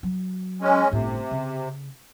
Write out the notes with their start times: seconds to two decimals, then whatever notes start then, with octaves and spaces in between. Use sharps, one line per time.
0.03 F#3
0.62 G#3 C#4
0.91 G1 A2 C3
1.31 C#3